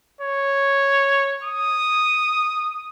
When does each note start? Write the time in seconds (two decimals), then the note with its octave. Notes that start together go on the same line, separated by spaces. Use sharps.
0.21 C#5
1.44 D#6